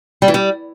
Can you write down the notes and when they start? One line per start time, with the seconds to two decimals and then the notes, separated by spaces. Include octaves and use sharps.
0.22 G3
0.28 E3
0.34 G3